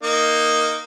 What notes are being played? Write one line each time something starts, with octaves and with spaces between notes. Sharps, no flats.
A#3 D#4